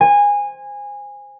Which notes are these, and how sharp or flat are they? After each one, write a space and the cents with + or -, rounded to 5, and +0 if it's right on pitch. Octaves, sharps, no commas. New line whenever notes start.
C5 +0 G#5 -20